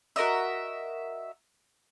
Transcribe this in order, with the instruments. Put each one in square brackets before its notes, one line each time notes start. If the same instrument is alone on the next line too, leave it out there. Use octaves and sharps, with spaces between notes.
[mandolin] F#4 A#4 D#5 E5